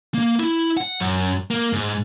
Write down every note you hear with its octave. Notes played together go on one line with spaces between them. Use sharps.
A#3
E4
F#5
F#2
A#3
G#2